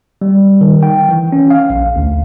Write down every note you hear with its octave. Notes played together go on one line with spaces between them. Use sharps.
G3
D#3
G5
E3
C#4
F5
A#1
D2